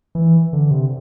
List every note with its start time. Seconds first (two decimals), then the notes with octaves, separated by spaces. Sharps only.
0.15 E3
0.53 D3
0.71 C3